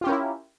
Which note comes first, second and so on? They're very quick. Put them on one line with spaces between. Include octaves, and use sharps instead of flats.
F4 G4 C#4 A#4 E4